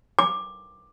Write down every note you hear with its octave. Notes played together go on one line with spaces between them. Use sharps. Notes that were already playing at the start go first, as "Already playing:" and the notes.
D6